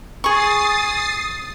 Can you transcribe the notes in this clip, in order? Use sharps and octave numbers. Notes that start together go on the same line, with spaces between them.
G#4 C#6 D#6 A6 C7